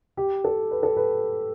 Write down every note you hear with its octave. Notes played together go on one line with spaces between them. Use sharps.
G4
A4
B4
A4
B4